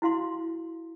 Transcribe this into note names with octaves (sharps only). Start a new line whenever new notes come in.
E4 F#4 F5 C6